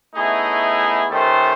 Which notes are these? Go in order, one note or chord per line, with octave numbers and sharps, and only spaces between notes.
A3 B3 C#4 D#4 E4 G#4
D#3 A3 C#4 G4 A4 C5